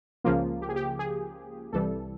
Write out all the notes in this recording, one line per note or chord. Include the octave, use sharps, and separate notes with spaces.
C#2 C#3 F3 A#3 F4
G4
G#4
G4
G#4
C2 C3 E3 G3 A4